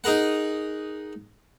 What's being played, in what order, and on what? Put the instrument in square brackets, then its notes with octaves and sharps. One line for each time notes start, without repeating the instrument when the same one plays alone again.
[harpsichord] D#4 G#4 A#4 F#5